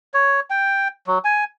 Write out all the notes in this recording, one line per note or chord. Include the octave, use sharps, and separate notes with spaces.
C#5
G5
F#3
G#5